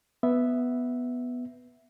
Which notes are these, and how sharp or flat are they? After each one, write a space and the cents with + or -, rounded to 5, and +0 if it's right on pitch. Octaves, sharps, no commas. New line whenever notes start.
B3 +0 E5 +0